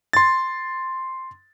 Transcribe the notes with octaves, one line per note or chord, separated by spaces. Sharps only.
C6 A6